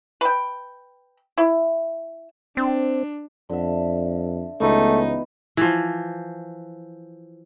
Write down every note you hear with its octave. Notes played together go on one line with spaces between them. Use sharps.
B4 G5
E4
C4 D4
F2 D3 E5
C#2 E3 A3 B3 D#4 F#4
E3 F3